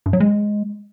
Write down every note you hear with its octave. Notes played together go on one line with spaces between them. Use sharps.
G2
F#3
G#3